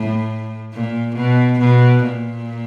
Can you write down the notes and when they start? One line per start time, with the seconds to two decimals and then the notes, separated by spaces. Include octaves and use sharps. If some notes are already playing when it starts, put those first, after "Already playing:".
Already playing: A2
0.73 A#2
1.16 B2
1.60 B2
2.03 A#2